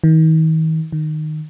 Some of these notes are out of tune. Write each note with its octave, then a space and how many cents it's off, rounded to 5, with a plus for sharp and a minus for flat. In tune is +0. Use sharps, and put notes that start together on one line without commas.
D#3 +40
D#3 -15